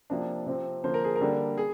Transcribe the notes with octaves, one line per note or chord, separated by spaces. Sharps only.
C3 F3 A#3 D4
C3 F3 C4
D3 F3 A#3 C5
A#4
G#4
A#4
D3 G3 A#3 D4
G#4